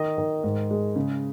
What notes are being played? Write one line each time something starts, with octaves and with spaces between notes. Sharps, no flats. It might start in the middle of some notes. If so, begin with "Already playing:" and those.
Already playing: D#3 D#5
D#3
G#2
G#3
C#3